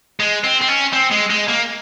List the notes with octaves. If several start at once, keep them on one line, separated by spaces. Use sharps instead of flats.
G#3
C4
C4
C#4
C4
G#3
G#3
A#3